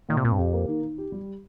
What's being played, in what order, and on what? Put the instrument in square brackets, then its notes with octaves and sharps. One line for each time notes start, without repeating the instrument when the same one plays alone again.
[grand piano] A#2 [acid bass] D#3
[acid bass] C3
[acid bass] A#2 [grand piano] C4
[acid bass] G2
[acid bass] F2 [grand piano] G4
[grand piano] A#3
D#3
D#3
G4
G3